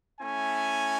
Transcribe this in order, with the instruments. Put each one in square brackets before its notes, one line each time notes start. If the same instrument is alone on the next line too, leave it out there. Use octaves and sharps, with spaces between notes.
[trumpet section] A3 C#4 E4 G#5